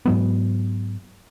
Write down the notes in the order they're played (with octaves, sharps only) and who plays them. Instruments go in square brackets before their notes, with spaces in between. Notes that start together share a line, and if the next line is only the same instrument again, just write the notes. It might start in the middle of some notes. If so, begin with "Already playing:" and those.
[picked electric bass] G#2 F#3 B3